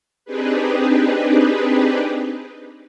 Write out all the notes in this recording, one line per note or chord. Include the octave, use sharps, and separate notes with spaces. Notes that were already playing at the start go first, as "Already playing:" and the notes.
C4 D4 D#4 G4 G#4 B4